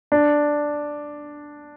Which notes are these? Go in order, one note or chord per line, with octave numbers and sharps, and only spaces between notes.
D4